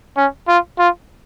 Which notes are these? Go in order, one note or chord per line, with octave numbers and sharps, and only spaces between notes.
C#4
F4
F4